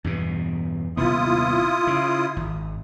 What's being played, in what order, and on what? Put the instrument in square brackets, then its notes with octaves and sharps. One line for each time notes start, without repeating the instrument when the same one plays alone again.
[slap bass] E2 G2 B2
[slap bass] D#1 C3 B3 [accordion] E4 F4 D#6
[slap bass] C#3
G#1